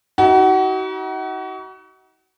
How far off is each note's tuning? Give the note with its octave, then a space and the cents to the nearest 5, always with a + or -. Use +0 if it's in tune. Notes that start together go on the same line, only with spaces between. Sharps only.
D#4 +40 F#4 +30